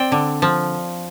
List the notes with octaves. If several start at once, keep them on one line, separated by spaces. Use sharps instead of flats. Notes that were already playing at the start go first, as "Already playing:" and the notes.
Already playing: C4 D5 G5
D3
F3